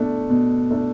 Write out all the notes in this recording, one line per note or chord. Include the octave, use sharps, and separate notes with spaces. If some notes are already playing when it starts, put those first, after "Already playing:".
Already playing: B2 A3 D4
B2
A3 D4